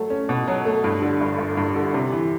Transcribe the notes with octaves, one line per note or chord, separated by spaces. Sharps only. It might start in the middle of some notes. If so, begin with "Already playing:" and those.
Already playing: F#3 A3
C#4
B2
F#3
A3
G2
D3
G1
G1
G2
D3
C3
E3